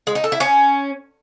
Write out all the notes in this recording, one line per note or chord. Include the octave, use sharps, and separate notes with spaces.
G#3
D#4
A4
E4
C#4